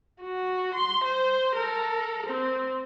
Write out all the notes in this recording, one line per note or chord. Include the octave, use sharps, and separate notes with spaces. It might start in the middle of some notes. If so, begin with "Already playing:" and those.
F#4
C6
C5
A4 A#4
C4